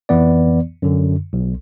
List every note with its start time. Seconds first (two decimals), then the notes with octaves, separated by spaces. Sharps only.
0.09 F2 E3 B3 D5
0.82 F#2 D3
1.33 B1